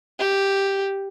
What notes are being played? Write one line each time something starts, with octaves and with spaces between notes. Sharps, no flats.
G4